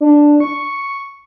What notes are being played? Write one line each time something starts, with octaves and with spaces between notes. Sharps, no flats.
D4
C#6